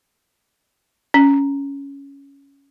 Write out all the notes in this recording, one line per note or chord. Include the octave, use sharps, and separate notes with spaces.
C#4